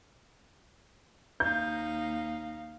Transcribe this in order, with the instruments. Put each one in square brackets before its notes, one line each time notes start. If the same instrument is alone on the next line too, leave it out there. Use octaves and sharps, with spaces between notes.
[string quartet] D#2 D#4 F5 [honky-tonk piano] G6